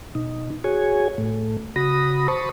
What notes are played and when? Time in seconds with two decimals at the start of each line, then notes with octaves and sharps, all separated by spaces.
0.15 B2 D#4
0.64 F#4 G#4 C#5 G#5
1.18 A2 A3
1.76 C#3 F#4 B5 D#6 A#6
2.28 C5 A5 B5 C#6 D#6